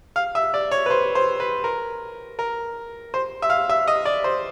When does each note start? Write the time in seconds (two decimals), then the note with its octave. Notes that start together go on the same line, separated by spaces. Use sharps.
0.16 F5
0.35 E5
0.54 D5
0.71 C#5
0.86 B4
0.90 C5
1.15 C5
1.40 B4
1.64 A#4
2.39 A#4
3.14 C5
3.42 E5
3.50 F5
3.69 E5
3.87 D#5
4.05 D5
4.24 C5